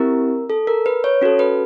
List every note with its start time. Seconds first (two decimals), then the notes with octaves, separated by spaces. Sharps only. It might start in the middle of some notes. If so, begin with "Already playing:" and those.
Already playing: C4 E4 G4 A#4
0.50 A4
0.67 A#4
0.86 B4
1.04 C#5
1.22 C#4 F#4 A4
1.39 B4